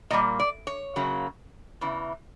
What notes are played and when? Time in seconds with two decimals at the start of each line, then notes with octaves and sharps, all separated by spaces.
0.10 A#2 G3 A#3 D#5
0.40 D5
0.67 C#5
0.96 F#2 C#3 F#3 A#3
1.81 E2 C#3 E3